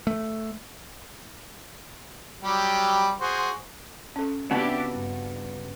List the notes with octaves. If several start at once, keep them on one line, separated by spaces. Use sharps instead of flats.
A3
F#3 G3 G4
F#4 G#4 C5
C#4 A4
C#3 B3 C4 D4 E4 F#4 G4 A5
G2